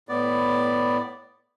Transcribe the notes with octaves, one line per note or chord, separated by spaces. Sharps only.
A2 B3 D5